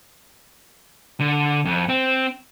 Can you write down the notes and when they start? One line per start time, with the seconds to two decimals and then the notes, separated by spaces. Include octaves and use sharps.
1.20 D3
1.65 F2
1.89 C4